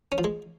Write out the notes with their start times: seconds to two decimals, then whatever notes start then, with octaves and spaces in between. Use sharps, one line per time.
0.12 C#4
0.18 F3
0.24 G#3